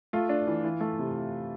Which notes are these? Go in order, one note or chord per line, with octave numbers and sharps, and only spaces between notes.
A3 F4
D4
E3
E3
A3
C3